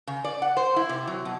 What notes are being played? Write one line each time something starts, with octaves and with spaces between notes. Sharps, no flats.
C#3
D5
F#5
C5
E4
C3
F#3
B2